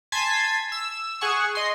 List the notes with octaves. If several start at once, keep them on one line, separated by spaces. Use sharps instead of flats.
G#5 A5 C6 G#6 B6
E6
G#4 F#5 G#5 C#6
D#5 C6